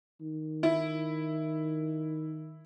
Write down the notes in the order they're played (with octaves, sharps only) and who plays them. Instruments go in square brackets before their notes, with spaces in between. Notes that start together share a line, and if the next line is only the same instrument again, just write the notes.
[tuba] D#3
[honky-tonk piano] E4